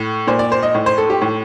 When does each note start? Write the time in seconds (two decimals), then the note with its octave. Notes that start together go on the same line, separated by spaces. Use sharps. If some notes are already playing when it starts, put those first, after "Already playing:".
Already playing: A2
0.27 A#2 C5
0.39 D5
0.52 C5
0.63 D#5
0.75 A2
0.86 C5
0.98 A4
1.10 G4
1.22 A2